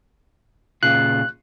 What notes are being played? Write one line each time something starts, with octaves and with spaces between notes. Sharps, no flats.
A#2 C#3 F4 F#6